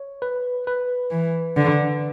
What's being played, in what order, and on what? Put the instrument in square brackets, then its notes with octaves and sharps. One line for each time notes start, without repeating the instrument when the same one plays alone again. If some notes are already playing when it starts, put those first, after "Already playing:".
Already playing: [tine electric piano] C#5
B4
B4
[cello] E3
D3